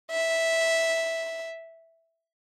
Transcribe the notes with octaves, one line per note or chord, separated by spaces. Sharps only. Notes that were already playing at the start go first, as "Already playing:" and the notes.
E5